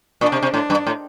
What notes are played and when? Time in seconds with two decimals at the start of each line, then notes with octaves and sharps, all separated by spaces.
0.21 A#2 D4
0.32 C3
0.42 C3
0.54 A2 D4
0.70 G2
0.87 A2